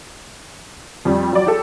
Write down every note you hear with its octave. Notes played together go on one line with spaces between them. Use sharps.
F2 G3
F#3 D5
G4 A4